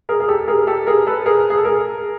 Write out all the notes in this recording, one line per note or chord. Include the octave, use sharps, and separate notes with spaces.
G#4 A#4
G#4
G4 A4
G#4 A#4
G4 A4
G#4 A#4
A4 B4
G#4 A#4
G#4
A4
G#4 A#4